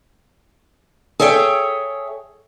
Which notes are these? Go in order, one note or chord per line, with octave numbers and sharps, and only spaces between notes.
G#4 A4 C#5 E5 G5